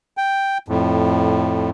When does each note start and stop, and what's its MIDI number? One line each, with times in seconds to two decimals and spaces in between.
0.17 0.58 79
0.68 1.70 41
0.68 1.70 45